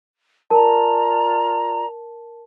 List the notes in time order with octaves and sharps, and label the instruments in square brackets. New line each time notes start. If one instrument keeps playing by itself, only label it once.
[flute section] F4 D5 A#5 [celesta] A#4 A5